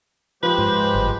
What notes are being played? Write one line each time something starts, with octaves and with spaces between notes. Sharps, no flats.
F3 G#3 G4 B4 C5
G#2
G1